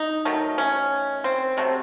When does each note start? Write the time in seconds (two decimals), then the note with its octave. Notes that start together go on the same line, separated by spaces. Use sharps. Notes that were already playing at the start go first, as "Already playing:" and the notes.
Already playing: D#4
0.25 D#3 F#3 A3
0.58 C#4
1.24 C4
1.57 C3 F#3 A3